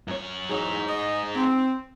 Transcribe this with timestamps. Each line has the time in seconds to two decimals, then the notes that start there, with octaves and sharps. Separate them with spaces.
0.08 F#2 C#5
0.50 E2 F#3 G#3 D#4 G#4
0.89 D#5
1.36 C4